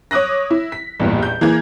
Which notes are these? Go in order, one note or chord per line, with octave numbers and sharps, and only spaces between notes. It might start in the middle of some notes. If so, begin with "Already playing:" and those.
C#5 D6 D#6 F#6 A#6
E4
B6
A1 E2 G2 A#2
G6
E3 A#3 G#4 G#6